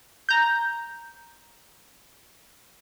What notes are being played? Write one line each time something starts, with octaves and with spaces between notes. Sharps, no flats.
A#5 G6